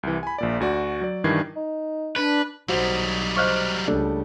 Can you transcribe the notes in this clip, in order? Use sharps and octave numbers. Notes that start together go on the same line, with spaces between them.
C2 E3
G#5 B5
A#1 A#2 D5
D2 F#4 D5
F#3 D5
G2 D#3 E3 D4 G#6 C7
D#4
D4 B4
B1 F#3 G3 D#4 F#4 C5
C5 D#5 C#6 F6 F#6
C#2 G3 A3 D4